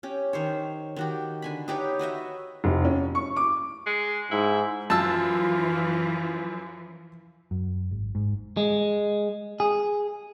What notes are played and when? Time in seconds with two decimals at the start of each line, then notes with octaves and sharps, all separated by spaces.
0.03 C#4 G4
0.33 D#3 C5 C#5
0.96 D#3 F#4 G4
1.42 D3 G#5 B5
1.68 D#4 G4 B4 C#5
1.99 F#4 B4 D#5 E5
2.64 F1
2.85 C#4
3.15 C#6
3.36 D6
3.86 G#3
4.31 G#2 E4
4.90 F#2 E3 F3 F4 A5 E6
7.51 F#2
7.91 G#1
8.15 G#2
8.57 G#3
9.60 G#4